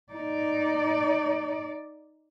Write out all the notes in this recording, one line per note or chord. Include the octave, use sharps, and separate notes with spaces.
D#4 D5